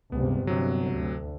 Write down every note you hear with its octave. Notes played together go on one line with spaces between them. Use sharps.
C#2 G2 C3 B3
G1 C3 F#3
D2